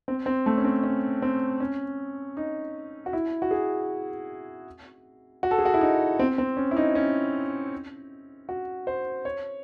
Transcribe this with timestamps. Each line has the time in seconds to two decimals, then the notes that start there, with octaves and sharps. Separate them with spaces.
0.08 C4
0.26 C4
0.46 A3
0.58 C#4
0.64 C4
0.84 C#4
1.22 C4
1.60 C#4
2.37 D#4
3.06 F#4
3.13 E4
3.42 F#4
3.51 G#4
5.43 F#4
5.51 A4
5.59 G#4
5.65 F#4
5.74 E4
5.81 D#4
6.19 C4
6.38 C4
6.57 C#4
6.71 E4
6.77 D#4
6.95 C#4
8.49 F#4
8.87 C5
9.25 C#5